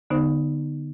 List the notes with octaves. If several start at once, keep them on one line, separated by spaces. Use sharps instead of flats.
D3 B3 D#4 C5